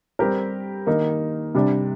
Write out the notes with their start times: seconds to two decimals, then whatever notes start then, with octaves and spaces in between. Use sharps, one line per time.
0.19 G3 C4 G4 A#4
0.87 D#3 A#3 D#4
1.55 C3 G3 D4